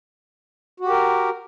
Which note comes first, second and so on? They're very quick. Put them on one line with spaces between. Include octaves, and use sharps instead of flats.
F#4 G4 A#4